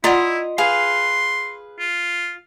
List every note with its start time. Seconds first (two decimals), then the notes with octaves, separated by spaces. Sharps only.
0.04 E4 F4 D5 D#5 F#5 A#5 C6
0.58 G#4 B4 F5 C6
1.79 F4